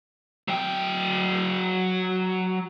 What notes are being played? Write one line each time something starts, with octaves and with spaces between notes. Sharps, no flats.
F#3 G5